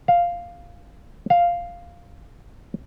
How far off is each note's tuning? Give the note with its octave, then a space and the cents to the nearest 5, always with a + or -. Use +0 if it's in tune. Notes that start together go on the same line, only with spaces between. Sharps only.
F5 +0
F5 +0